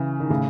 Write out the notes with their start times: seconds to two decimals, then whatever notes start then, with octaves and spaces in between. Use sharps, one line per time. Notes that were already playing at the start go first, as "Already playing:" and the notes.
Already playing: C#3 E3
0.20 D#3
0.30 A2 C#3